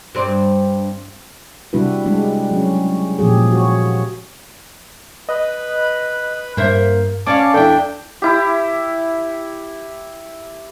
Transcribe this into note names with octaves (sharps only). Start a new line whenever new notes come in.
G2 C4 D5
C3 G3 D4 E4 F#4 B4
G3 G#3 D4
F#3 C#4
A#2 F3 G4 G#4
F#4 C#5
B4 D#5
G2 A#3 C5 E5
C#4 D5 F5 A5 D6
E2 D4 E4 A4 G5
E4 G4